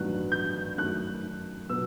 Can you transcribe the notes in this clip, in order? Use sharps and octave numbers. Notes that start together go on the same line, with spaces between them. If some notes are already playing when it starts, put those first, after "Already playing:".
Already playing: A1 G2 D#3 F#3 B3 F#6
G6
F#2 D#3 A3 F#6
B2 F#3 B3 E6